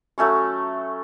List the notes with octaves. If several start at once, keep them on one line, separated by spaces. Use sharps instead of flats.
F#3 A3 C#4 C#6